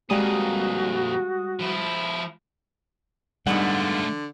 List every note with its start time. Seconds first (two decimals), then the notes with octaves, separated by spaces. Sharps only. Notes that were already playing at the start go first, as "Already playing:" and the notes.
0.10 F2 A#2 G3 G#3 F#4 F5 F#5 D#6
1.59 F3 E4
3.47 G#2 D3 G3 A3 B3 F4 F#5